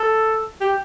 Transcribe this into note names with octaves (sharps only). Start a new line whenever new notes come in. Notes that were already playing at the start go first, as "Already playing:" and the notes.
Already playing: A4
G4